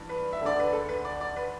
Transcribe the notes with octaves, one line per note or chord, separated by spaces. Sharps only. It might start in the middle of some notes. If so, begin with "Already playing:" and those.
Already playing: G2 E3
B4
E5
D2 D3 D5
B4
A4
B4
D5
D5
B4